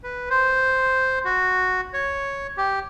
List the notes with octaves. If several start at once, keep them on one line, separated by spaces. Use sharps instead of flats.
B4
C5
F#4
C#5
G4